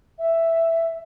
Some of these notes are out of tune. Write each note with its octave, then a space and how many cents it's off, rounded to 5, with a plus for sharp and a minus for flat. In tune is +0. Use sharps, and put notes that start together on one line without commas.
E5 +5